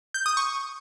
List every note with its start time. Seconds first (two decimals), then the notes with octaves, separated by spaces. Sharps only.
0.14 G6
0.26 D#6
0.37 C#6